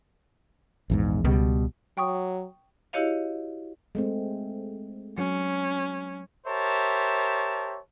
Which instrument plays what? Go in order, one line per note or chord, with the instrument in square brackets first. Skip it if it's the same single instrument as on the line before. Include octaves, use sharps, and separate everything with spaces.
[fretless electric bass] A#1 E2 G#2
[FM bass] C#2 [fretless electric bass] B2 G3
[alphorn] F#3 [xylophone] G5 C#6 D#6
[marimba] E4 F#4 G4 C#5 D#5 F5
[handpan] G#3 A3 C4
[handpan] F#3 [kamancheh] C#4
[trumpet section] G4 A#4 C5 C#5 E5 A5